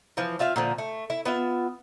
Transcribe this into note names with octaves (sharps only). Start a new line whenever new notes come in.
E3 F3
C4 F4 E5 F5
A#2 D3 F3
A3
E4
B3 F4 E5